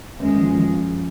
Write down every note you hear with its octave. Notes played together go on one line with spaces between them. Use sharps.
F#2 G#3
F3
F3